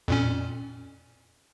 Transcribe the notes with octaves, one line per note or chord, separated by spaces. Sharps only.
F2 A#2 C#4